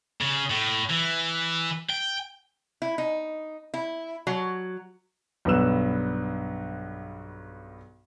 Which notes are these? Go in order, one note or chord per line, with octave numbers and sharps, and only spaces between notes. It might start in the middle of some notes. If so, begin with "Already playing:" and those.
C#3
A2
E3
G5
E4
D#4
E4
F#3
B1 G2 B3 B4 E6 E7